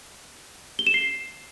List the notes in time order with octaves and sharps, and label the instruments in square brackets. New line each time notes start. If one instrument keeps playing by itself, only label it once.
[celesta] G7
E7
C7